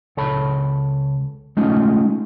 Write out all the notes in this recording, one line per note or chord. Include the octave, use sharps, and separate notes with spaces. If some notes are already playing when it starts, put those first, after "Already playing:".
C#2 A4 C#5 A5 B5
G#3 A3 C#4 D#4 F4